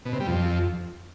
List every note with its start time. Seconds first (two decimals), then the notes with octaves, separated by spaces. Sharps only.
0.05 B2
0.13 C3
0.20 G3
0.28 F2